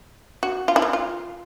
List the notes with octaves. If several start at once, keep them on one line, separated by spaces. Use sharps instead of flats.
F#4
F4
E4
F4
F4